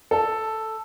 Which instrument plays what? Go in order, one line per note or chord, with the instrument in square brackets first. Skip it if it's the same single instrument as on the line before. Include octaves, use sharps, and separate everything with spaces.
[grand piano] A4